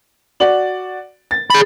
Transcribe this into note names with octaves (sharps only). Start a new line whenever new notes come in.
F#4 D5 F#7
A6
G#4 B5